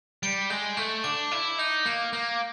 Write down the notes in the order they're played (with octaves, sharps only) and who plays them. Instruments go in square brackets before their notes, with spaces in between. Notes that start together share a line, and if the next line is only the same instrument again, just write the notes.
[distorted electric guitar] G3 [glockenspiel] D7
[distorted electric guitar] G#3 [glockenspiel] G6
[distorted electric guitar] A3 [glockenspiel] G6
[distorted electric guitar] D4 [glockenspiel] D6
[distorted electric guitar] E4 [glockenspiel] D6
[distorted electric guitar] D#4 [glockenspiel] G6
[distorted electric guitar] A#3 [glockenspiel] G6
[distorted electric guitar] A#3 [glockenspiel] G6